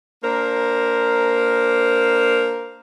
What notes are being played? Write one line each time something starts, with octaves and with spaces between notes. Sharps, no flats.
A#3 D4 A#4 C5